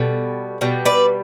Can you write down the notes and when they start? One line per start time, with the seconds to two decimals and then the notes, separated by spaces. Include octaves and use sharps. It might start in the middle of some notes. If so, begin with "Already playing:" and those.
Already playing: B2 G3 A4
0.61 B2 G3
0.85 B4 D5